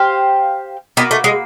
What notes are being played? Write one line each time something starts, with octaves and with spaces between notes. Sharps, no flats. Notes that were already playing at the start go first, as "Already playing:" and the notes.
Already playing: G4 C5 F5
A#3 B3 D4 F#4 B4
A3
G#3